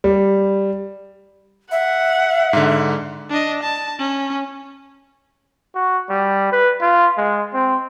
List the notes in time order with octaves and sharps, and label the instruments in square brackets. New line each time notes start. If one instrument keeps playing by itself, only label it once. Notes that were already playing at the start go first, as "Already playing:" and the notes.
[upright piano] G3
[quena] E5 [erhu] F#5
[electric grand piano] G#2 D3
[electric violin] D4 D#5
A5
C#4
[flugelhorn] F#4
G3
B4
F4
G#3
C4